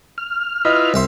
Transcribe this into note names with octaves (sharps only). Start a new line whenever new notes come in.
F6
E4 F4 B4 D#5
C2 E5 C6